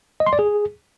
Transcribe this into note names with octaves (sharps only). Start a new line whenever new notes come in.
D#5
C6
D5
G#4